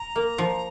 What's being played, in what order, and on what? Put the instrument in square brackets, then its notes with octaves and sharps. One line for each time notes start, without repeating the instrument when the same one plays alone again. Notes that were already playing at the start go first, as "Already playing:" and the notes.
Already playing: [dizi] A#5
[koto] A#3
F3